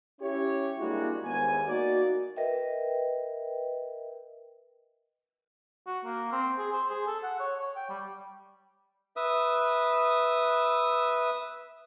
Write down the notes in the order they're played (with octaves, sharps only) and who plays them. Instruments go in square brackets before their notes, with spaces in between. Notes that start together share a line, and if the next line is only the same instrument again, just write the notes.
[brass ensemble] C#4 E4 G4 C#5
G3 G#3 A#3 D4 E4 F#4
D#2 G#2 B3 G#5
A#3 D#4 F#4 D5
[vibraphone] A#4 B4 D#5 E5 G5
[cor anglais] F#4
A#3
C4
G#4
C5
G#4
A4
F#5
C#5
C#5
G5
G3
[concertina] B4 E5 D#6